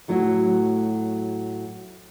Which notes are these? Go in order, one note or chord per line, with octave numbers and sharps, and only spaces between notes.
A2 F#3 A3 E4 F#4